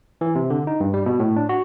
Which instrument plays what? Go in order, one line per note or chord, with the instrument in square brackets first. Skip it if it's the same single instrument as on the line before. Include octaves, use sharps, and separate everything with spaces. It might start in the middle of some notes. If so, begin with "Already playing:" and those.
[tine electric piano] E3
C3
D3
D#4
G2
G3
B2
A2
D4
F#4